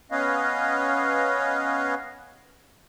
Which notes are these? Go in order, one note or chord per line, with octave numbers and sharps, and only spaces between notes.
B3 C#4 B4 C#5 D#5 F5